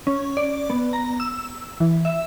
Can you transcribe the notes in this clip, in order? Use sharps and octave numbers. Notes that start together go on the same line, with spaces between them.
C#4
D5
B3
A#5
E6
E3
E5